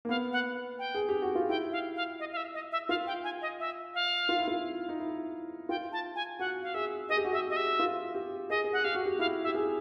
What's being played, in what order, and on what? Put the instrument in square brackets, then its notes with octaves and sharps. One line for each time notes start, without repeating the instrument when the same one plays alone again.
[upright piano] A#3
[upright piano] B3 [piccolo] F5
[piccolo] F#5
G5
[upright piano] G#4
G4
F#4
F4
[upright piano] E4 [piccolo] G5
[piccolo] F5
F5
D#5
F5
E5
D#5
E5
[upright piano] F4 [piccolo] F5
[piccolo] G5
G#5
D#5
E5
F5
[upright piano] F4
E4
F4
D#4
E4
[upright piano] F4 [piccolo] G5
[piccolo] A5
G#5
[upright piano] F#4 [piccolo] F#5
[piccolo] F5
[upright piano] G#4 [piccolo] E5
[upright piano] G#4 [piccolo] D#5
[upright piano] G4
F#4
[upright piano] G4 [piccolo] E5
[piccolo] D#5
E5
[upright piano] F4
G4
[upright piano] G#4 [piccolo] D#5
[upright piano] G#4
[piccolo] F#5
[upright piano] G4 [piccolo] F5
[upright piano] F#4
G4
[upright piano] E4 [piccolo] F5
[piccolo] E5
[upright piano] G4
G#4